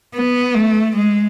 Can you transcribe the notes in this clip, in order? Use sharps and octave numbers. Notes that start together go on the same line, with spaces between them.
B3
A3
G#3